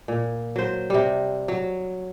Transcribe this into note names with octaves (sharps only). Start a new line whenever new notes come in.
A#2
F#3 C5
C3 G3
F#3